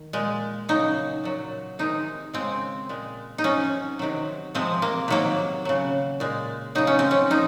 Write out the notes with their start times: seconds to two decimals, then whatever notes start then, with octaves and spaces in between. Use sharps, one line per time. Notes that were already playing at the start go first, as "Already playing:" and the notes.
Already playing: D#3
0.13 A#2 G#3
0.69 C#3 F#3 D#4
1.24 A#2 F#3
1.79 C3 D#3 G#3 D#4
2.34 C#3 G#3 C4
2.89 A#2 G#3
3.38 D#4
3.44 C3 F#3 C#4
3.99 C3 D#3 F#3
4.55 C3 F3 G#3 C4
4.82 A#3
5.08 C3 D#3 F#3 A#3
5.65 C#3 F#3
6.20 A#2 G#3
6.75 C#3 F#3 D#4
6.87 C#4
6.99 C4
7.11 C#4
7.30 A#2 F3 D#4